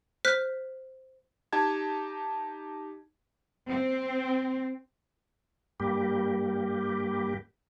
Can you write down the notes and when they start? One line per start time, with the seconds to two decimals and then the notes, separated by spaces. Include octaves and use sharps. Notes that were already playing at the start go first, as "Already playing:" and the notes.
0.25 C5 F6 F#6 B6
1.53 D#4 G4 A5 G#6
3.68 C4
5.80 G2 G3 A#3 G4